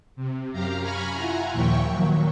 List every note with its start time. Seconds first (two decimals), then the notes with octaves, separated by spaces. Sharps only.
0.16 C3
0.52 F#2 G4 F5 A#5
0.81 G#5 A#5 B5 C#6 F6
1.14 E4 F4 F#5 G#5 A#5
1.52 D#2 A#2 F3 E5 G5 C#6
1.89 A#2 D#3 F#3